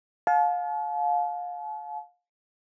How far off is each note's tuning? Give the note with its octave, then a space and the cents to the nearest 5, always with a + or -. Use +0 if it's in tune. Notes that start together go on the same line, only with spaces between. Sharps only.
F5 +30 A5 -40